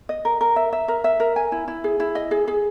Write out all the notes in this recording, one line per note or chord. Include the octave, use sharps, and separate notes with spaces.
D#5
A#4
A#4
E5
E5
A#4
E5
A#4
G#5
E4
E4
G#4
E4
D#5
G#4
G#4